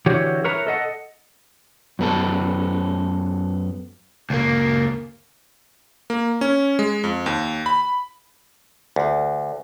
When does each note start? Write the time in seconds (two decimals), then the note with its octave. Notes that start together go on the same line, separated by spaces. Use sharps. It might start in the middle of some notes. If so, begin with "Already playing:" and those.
0.06 D3 E3 F#4 G4 C#5
0.44 A#4 B4 C#5 E5 A#5
0.67 A4 D#5 F#5
1.99 F#2 B3 A4
4.30 C#2 A#3
6.10 A#3
6.41 C#4
6.79 G#3
7.04 F2
7.26 D#2
7.66 B5
8.96 D2